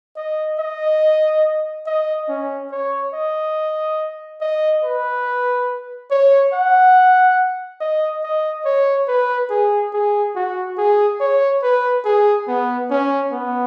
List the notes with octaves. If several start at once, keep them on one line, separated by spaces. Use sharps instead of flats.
D#5
D#5
D#5
C#4
C#5
D#5
D#5
B4
C#5
F#5
D#5
D#5
C#5
B4
G#4
G#4
F#4
G#4
C#5
B4
G#4
B3
C#4
B3